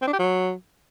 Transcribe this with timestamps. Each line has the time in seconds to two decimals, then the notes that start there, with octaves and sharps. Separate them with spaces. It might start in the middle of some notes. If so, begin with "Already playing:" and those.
0.02 C4
0.07 D4
0.13 G4
0.19 F#3